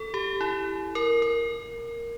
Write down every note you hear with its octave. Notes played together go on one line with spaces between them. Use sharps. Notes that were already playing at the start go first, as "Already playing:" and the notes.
Already playing: A4
G4
E4
A#4
A#4